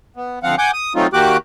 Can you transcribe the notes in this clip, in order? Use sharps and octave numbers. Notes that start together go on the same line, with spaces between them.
B3
D2 F3 C4 F5 F#5
F#5 G#5 D6 G6
D#6
F#3 A3 C4 D#4 F4
D#3 A#3 F#4 G4 D6 F#6